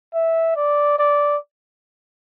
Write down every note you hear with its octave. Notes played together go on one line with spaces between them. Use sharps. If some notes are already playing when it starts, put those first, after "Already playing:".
E5
D5
D5